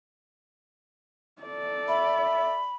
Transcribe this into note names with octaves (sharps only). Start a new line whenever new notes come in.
A4 D5
E5 B5